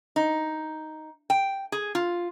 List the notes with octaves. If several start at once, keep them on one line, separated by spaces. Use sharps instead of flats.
D#4
G5
G#4
F4